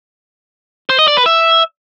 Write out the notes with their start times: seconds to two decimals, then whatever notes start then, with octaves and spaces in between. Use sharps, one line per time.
0.90 C5
0.99 D#5
1.08 D5
1.17 B4
1.26 E5